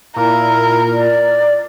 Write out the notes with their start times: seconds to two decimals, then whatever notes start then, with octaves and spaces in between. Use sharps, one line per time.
0.16 A#2 E4 A#4
0.93 D5